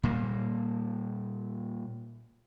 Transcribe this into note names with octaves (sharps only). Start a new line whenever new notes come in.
A#2 G3 A#3